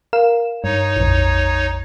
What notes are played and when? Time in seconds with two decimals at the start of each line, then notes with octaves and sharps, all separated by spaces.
0.13 A#4 F5 E7
0.64 G2 D#4 C#5
0.96 A#1 F2